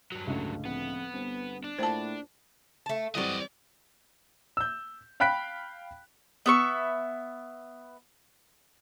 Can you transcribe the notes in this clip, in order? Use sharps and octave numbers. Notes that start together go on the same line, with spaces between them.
G2 F#3
C#2 A2 D3
F2 B3
G1 C4
D4
A2 A#3 F4 C5 A5
A3 A5
E3 F#3 G3 C4 D5 D#5 F#5
E6 G6
F5 G5 B5 F#6 B6 D7
B3 E5 C#6